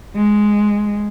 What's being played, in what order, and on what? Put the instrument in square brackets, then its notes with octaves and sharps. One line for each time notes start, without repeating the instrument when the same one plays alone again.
[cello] G#3